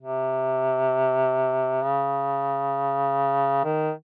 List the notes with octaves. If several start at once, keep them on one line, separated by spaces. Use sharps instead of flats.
C3
C#3
D#3